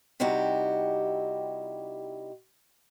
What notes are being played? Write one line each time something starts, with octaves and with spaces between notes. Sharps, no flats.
C3 G3 D#4 E4 F#4 G4